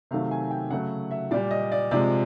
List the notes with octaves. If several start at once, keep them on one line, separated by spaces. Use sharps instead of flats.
C3 D#3 F#3 A3 F5
G#5
G5
C#3 F#3 A3 F#5
E5
A#2 G3 D5
D#5
D5
C3 F3 G#3 D5